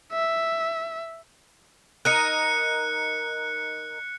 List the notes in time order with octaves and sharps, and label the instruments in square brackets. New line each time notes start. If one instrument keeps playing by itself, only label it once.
[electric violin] E5
[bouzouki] D#4 A#4 [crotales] F#6 C#7